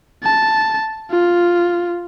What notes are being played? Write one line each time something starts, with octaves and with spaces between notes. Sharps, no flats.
A5
F4